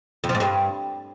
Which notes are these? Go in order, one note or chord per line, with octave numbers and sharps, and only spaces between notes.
F2
F3
G#2
G2